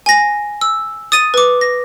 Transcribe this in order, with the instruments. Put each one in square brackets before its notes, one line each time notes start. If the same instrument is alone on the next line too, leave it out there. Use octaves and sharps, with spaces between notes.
[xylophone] G#5 A#6
E6
D#6 A6 D#7
B4 D6
A#6